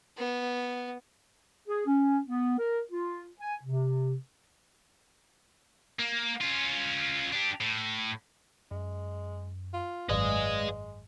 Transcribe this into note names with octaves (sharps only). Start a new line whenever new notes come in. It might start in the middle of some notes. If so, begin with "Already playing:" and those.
B3
G#4
C#4
B3
A#4
F4
G#5
C3
A#3
C#4 F4
D4 G4
A2
F#2 G#3
F4
G#1 F#2 G#3 G#4 B4 D5 D#5 F5